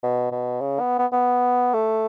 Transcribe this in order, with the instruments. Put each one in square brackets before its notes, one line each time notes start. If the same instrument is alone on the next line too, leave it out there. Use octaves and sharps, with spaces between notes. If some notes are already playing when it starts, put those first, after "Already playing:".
[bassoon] B2
B2
C#3
B3
B3
B3
A3